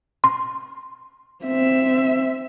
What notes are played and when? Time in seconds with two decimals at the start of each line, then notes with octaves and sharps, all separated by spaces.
0.24 C6
1.45 C4 E5